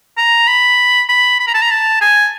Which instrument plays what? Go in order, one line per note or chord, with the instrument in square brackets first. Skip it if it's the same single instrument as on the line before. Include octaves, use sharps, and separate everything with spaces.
[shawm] A#5
B5
B5
B5
A#5
A5
A#5
A5
G#5